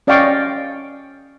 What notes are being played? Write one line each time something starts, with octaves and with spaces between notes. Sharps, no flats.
C#4 D5 D#5 F5 G5 C#6